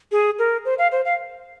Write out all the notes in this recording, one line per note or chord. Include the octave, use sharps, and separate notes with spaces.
G#4
A#4
C5
F5
C5
F5